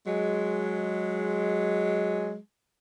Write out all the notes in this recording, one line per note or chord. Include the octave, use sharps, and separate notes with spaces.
F#3 G#3